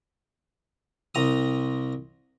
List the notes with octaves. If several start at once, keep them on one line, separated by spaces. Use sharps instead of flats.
C2 A#5 D#6